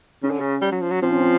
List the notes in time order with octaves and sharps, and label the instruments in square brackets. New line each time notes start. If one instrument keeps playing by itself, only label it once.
[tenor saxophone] C#3 [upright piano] C#4
[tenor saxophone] D3
C#3
G3
F#3
F3
F#3
[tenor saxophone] F3 [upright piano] C4
[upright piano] C#4
C4